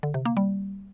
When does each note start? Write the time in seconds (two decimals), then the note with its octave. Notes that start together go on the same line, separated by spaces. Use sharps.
0.03 D3
0.14 C3
0.25 A#3
0.37 G3